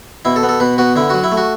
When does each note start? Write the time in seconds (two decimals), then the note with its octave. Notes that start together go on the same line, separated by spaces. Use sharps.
0.25 B2 E4
0.36 A4
0.43 B3
0.49 A4
0.60 B2 B4
0.78 B3 F#4
0.96 D3 E4
1.10 F#3 F#4
1.24 E4
1.32 A3
1.37 F#4